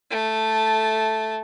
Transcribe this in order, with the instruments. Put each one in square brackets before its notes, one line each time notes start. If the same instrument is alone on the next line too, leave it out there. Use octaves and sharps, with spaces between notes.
[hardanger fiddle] A3 A5